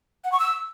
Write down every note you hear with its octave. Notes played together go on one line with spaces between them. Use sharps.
F#5
C#6
E6